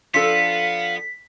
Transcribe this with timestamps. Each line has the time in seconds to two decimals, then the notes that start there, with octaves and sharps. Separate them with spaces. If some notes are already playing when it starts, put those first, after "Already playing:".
0.14 F3 B3 D4 A4 F5 B6